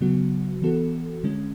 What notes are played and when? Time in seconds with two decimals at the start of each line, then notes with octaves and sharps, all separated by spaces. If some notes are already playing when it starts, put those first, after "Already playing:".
0.01 C#3 F#3 B3 F#4
0.62 E3 B3 F#4 A4
1.24 D3 G#3 C#4